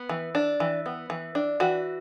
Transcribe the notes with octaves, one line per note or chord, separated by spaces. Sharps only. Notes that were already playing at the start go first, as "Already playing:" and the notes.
Already playing: B3
E3
D4
E3
B3
E3
D4
E3 F#4